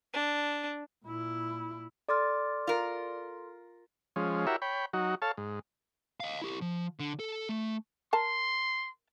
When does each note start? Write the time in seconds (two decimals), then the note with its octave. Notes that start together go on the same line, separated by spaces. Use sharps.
0.14 D4
1.05 A#2 E4
2.09 A4 D5 C6 D6 F6 A6
2.67 F4 A#4
4.16 F3 G#3 C#4
4.47 E4 F#4 G4 A#4 C#5 E5
4.62 C#5 G5 B5
4.93 F#3 D#4 F#4
5.22 A4 C#5 F5 A5
5.37 G#2
6.20 D#5 F5
6.42 E4 G4
6.61 F3
7.00 D3
7.19 A4
7.49 A3
8.13 A#4 A5 C6